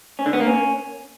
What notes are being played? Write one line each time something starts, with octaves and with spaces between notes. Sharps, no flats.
C#4
D3
B3
A#3
C#4